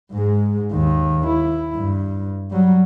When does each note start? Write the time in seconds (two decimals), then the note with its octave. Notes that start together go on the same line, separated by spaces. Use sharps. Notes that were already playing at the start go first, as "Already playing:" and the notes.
0.12 G#2 G#3
0.72 D#2 D#3
1.27 E4
1.77 G2
2.51 F#3 G3